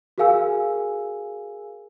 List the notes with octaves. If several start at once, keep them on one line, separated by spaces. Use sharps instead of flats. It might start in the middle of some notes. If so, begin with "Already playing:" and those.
F#4 G#4 A#4 F5 G#5 E6